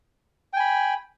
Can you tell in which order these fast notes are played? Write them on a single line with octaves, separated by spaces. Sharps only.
G5 G#5 B5